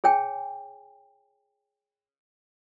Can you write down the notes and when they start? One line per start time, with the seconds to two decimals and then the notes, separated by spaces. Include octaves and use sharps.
0.04 G#4 C#5 G5 G#5